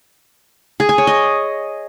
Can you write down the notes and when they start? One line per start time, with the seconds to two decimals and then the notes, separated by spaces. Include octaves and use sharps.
0.80 G#4
0.89 G#5
0.98 C#5
1.07 D#5